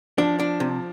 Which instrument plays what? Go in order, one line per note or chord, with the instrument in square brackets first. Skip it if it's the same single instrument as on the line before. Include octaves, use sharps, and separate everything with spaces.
[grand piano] F3 [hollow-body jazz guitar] D4
[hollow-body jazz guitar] D4
C3